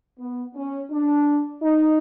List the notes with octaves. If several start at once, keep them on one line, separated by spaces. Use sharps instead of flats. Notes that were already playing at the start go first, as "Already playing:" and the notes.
B3
C#4
D4
D#4